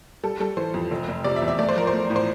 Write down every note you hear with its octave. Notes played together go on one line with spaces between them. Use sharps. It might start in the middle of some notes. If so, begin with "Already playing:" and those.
G3 A4
G3 A4
E3 C5
F2
F1
F1
C3 D5
E5
E2
E5
A3 D5
C5
F3 A#4
C5
A3
A2
C5